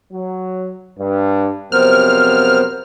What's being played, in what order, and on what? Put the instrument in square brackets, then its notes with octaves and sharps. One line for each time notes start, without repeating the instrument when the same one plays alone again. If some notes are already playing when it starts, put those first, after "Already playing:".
[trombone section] F#3
G2
[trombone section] F2 C3 F#3 [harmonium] B3 A#4 C5 [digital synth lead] F6